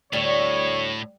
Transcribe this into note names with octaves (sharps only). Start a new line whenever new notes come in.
D2 A2 G3 C#5